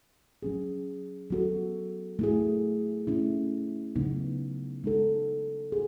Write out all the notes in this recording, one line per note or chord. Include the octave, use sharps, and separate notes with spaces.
F#3 C#4 G#4
F#3 B3 F#4 A4
A3 E4 G#4
A3 C#4 E4
C#3 F#3 B3 D#4
G#3 D#4 A4
G#4